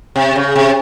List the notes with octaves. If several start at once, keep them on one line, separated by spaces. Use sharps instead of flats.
C3
C#3
C3